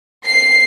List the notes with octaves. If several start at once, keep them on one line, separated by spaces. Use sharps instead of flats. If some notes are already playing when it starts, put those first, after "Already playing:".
C7